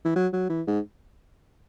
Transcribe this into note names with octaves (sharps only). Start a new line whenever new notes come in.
E3
F#3
F#3
E3
G#2